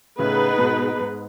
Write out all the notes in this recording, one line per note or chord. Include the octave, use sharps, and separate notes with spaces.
A2 C#3 B3 D#4 G#4 B4
G#2 B2
G#2